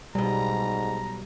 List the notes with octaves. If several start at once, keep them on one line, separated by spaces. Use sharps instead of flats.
B1 G#2 B2 G3 A#5